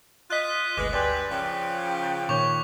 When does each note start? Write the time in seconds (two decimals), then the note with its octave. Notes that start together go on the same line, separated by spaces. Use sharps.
0.30 F4 D#5 F#6 B6
0.77 G1 D2 G#3 B4 D6
0.93 G2 G4 B4 D5 G5 G#5 C6
1.30 C#3 F3 G5
2.29 A#2 D#3 C#5 C#6 D6 G6 F7